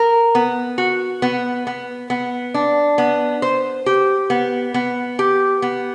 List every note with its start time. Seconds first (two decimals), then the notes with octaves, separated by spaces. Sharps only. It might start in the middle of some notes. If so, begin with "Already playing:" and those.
Already playing: A#4
0.35 B3
0.78 F#4
1.22 B3
1.67 B3
2.10 B3
2.54 D4
2.98 B3
3.42 C5
3.86 G4
4.30 B3
4.74 B3
5.19 G4
5.62 B3